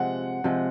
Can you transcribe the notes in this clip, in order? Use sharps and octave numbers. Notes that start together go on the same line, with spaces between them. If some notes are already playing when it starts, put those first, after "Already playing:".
Already playing: C3 F3 G#3 F#5
C3 F3 G#3